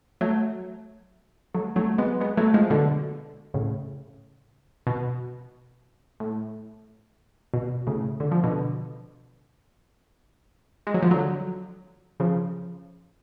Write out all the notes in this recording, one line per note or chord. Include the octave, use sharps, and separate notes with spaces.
F#3 A3
F#3 A3
F#3 A3
G#3 B3
G#3 B3
F#3 A3
F3 G#3
B2 D3
A2 C#3
B2
A2
B2
A2 C#3
D3
F3
B2 D3
G#3
F#3
F3
D3 F#3
C#3 F3